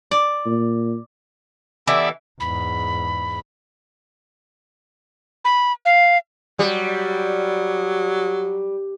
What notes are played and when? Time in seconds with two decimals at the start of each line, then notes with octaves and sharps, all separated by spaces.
0.11 D5
0.46 A#2
1.87 E3 B3 G4 A4 D5 E5
2.40 E2 G#2 B5
5.45 B5
5.85 F5
6.59 F#3 G3